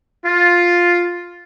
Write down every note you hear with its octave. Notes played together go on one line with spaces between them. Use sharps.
F4